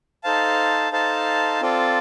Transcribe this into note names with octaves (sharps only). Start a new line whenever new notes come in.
D#4 A4 C5 F5 A5
D#4 A4 C5 F5 A5
C4 F4 A4 D5